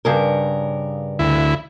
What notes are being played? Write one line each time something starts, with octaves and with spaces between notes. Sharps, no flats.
G2 C#3 A#4
D2 E4